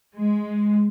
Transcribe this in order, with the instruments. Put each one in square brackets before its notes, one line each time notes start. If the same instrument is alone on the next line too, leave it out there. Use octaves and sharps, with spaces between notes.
[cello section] G#3